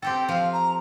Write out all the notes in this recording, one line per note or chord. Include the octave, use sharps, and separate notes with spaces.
C4 G4 A4 G5
F3 F5
A#5